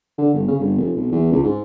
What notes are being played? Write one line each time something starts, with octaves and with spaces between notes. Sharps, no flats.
D3
G1
C#3
G1
F1
B1
E2
C#2
G#2